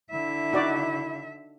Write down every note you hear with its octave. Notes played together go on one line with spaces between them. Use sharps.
D3 E4 E5
D#4 F#4 D5